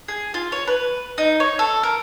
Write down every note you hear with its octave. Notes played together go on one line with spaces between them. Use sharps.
G#4
F4
C#5
B4
D#4
C#5
A4
A#4